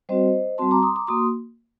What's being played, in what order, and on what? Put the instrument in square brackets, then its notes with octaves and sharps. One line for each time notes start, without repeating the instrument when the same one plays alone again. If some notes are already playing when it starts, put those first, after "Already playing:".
[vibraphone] G3 C4 F#4 C5 D#5
G3 C4 F#4 A5 C6
A#5 D6
C6 D#6
A#5 D6
A#3 F#4 C6 D#6